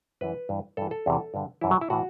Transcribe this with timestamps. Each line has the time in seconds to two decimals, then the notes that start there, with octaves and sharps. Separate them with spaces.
0.21 F#2 E3 B4
0.49 G2 E3
0.77 G2 E3 A4
0.91 A4
1.06 E2 C3 E3
1.34 G2 D3
1.61 F#2 E3 E4
1.71 F#3
1.81 E4
1.90 A2 E3 F#4